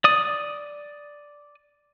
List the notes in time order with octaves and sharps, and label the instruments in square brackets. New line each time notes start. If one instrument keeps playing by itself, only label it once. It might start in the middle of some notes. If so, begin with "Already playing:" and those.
[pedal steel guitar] D5 D#6